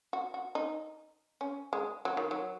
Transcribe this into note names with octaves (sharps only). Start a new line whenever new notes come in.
F#4
F#4
D#4
C#4
G#3
F#3
D#3
F#3